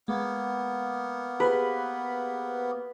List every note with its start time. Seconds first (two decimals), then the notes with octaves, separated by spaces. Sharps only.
0.08 G#3 A#3 B3
1.40 G4 G#4 B4 C5